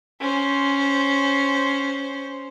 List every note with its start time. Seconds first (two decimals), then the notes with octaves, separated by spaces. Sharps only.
0.21 C#4 C5